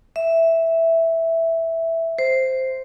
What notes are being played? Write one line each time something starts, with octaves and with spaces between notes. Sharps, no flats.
E5
C5